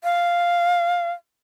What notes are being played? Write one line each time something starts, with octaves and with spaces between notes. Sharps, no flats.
F5